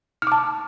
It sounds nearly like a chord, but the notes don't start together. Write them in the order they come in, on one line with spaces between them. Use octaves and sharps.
F6 D6 A5